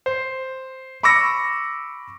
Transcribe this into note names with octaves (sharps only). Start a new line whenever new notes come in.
C5
B5 C#6 D6 E6 A#6 C#7